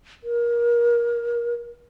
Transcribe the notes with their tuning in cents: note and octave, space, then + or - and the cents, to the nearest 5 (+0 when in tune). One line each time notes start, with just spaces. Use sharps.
A#4 +25